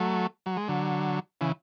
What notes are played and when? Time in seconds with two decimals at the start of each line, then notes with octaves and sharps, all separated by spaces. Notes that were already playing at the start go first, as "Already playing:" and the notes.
Already playing: F#3 A3
0.46 F#3
0.57 G#3
0.68 D3 F#3
1.41 C#3 E3